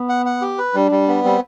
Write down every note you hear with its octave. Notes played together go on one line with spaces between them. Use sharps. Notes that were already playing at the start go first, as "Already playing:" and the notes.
Already playing: B3
F#5
F#5
G4
B4
G3 D4
G3
B3
G3 C4